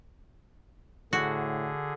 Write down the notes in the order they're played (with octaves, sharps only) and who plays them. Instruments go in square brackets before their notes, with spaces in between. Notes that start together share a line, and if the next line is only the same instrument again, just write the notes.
[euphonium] A2 [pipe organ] D3 G#4 [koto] F#4